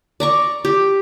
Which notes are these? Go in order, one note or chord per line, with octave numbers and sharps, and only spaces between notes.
D5 A#5 C#6
G4